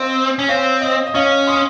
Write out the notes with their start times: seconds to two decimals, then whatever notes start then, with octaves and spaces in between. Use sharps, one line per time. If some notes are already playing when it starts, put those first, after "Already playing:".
Already playing: C4 D#5 F5
0.39 C#4
0.48 C4 C#5 F5
0.81 D#5
1.07 D#5
1.14 C#4 C#5 F5
1.47 C6 D#6